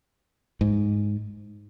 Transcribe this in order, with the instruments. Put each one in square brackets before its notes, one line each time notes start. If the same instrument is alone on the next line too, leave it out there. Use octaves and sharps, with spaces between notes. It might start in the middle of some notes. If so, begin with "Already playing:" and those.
[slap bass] G#2